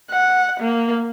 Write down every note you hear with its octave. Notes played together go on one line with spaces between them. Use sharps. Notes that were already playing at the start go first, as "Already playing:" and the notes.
F#5
A#3